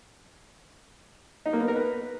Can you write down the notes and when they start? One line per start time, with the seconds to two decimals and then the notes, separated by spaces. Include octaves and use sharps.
1.46 D#4
1.53 A#3
1.61 B3
1.68 A#4
1.76 B4